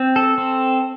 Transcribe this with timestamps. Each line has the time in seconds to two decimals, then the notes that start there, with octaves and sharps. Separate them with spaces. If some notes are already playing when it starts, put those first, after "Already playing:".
Already playing: C4
0.16 A4
0.38 C4